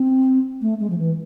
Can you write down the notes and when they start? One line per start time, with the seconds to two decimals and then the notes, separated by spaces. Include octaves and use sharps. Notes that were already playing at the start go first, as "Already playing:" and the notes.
Already playing: C4
0.62 A3
0.80 G#3
0.90 F3
0.98 E3